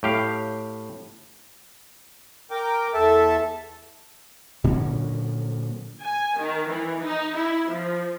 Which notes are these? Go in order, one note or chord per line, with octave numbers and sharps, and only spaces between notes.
A2 G4 F5
A#4 G5 D6
E2 A4 E5 A5
A#2 D3 F#3 C#4
G#5
D#3
E3
D#4
E4
F3